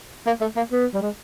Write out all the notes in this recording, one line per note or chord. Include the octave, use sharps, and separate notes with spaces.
A#3
A3
A#3
B3
G3
G#3